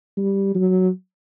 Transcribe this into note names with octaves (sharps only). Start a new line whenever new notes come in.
G3
F#3